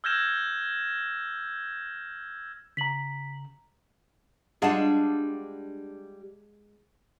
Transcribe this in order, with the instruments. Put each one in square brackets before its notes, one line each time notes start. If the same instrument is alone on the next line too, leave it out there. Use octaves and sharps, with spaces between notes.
[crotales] E6 F6 G6 G#6 A#6 E7
[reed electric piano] C#3 A#5 [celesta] B6 F#7
[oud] G3 D4 F4 [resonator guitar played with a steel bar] G#3 F#5 A5